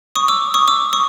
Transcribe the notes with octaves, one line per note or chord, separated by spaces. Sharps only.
C#6 D#6
D6 E6
C#6 D#6
D6 E6
C#6 D#6